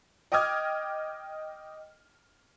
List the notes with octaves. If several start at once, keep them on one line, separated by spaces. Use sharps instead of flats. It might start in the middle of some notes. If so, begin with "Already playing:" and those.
D#5 G5 D6 D#6 F6 G#6